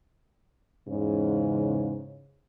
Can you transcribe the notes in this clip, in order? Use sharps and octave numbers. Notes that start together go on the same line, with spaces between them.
E2 G#2 C#3